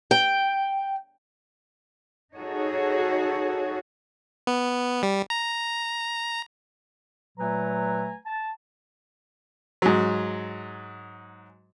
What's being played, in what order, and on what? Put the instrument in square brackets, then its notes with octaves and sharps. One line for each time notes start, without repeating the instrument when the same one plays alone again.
[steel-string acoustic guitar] G5
[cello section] D#4 F#4 G#4 A4 C#5
[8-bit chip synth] B3
G3
A#5
[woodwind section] A#2 F#3 A3 B4 G#5 A#5
A5
[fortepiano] G#2 F#3